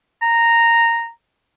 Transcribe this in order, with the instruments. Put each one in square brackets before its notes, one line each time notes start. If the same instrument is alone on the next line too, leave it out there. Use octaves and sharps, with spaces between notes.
[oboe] A#5